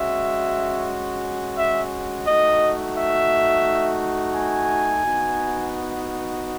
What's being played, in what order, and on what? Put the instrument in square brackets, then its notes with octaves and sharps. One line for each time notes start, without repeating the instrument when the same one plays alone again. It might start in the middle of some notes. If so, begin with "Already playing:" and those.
Already playing: [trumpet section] G#3 C#4 F#4 E5
E5
A3 D#4 F#4 D#5
E5
G#5
B3 D#4 F#4